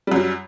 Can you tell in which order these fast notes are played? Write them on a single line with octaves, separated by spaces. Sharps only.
G3 F#2 F#3